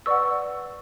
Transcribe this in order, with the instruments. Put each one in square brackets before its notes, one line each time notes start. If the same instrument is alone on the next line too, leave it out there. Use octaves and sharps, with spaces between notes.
[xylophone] B4 D5 F#5 C#6 E6